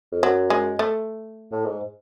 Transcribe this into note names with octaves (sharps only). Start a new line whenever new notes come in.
F2
F#2 F#3
G#3
A3
A2
G#2